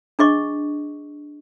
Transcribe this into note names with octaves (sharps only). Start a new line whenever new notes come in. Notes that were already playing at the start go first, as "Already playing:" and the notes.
D4 G#4 D#5 C#6